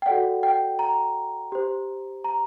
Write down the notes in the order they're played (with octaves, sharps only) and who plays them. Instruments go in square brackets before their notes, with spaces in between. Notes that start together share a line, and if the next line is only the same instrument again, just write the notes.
[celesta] G5
F#4 A4 D5 F#5
G5
A#5
G4 C5
A#5